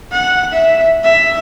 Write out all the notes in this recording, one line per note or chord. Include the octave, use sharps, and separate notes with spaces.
F#5
E5
E5